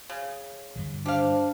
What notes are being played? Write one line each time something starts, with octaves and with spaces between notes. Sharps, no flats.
C#3
G2 D3 D#3
D4 G4 C5 F5